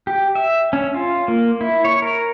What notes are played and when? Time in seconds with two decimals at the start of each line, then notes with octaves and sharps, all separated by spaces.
0.07 G4
0.35 E5
0.73 C#4
0.94 F4
1.28 A#3
1.61 E4
1.85 C#5
2.02 A#4